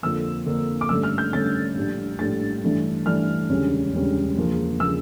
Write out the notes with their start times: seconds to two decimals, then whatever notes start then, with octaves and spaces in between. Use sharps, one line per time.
0.03 F2 D3 F3 A#3 E6
0.46 F2 D3 F3 A#3
0.81 D6
0.89 G2 D3 A3 C#4 E6
1.03 F6
1.18 G6
1.33 G2 D3 A3 C#4 A6
1.76 A#1 A2 G3 D4
2.19 A#1 A2 G3 D4 A6
2.64 G2 E3 A3 D4
3.06 G2 E3 A3 D4 F6
3.49 E1 D2 C#3 G3 C#4
3.92 E1 D2 C#3 G3 C#4
4.37 E1 E2 C#3 F3 A#3
4.80 C#3 F3 A#3 E6